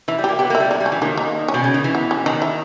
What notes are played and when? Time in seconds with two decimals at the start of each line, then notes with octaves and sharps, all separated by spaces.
0.08 E3 E4
0.18 G3
0.24 A#3 G4
0.39 B3 G4
0.50 A#3
0.55 E4
0.60 G3
0.71 G#3 D#4
0.80 G3
0.86 C#4
0.92 E3
1.01 D#3 A#3
1.17 A#3
1.48 C#4
1.54 B2
1.64 C#3
1.74 D#3
1.84 E3
1.95 B3
2.11 C#4
2.26 D#3 D#4
2.42 E4